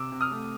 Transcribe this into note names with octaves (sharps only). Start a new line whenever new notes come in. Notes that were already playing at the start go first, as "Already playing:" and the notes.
Already playing: C3 D6 E6
C3
D#6 F6
A3